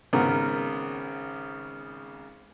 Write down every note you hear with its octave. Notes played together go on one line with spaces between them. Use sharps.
G#1 C#3 B3 A#4